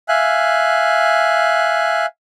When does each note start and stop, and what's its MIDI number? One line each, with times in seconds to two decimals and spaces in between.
0.09 2.06 76
0.09 2.06 77
0.09 2.06 80
0.09 2.06 90